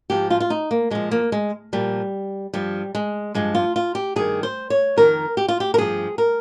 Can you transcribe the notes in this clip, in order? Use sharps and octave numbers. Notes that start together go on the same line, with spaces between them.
G#2 F3 G4
F4
F4
D#4
A#3
A#2 F3 G#3
A#3
G#3
A#2 F3 G3
G2 F3 G3
G#3
G2 F3 G#3
F4
F4
G4
G2 D#3 G#4
C5
C#5
F2 D#3 A#4
G4
F4
G4
A#4
G2 F3 G#4
A#4